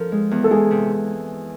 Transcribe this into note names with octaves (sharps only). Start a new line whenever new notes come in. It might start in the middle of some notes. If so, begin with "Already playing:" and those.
Already playing: F3 A4 A#4
G#3
E2
A4
G#3 G#4
C3